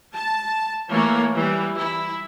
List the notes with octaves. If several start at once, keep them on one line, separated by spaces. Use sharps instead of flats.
A5
E3 A3 A#3 C#5
E3 G3
E4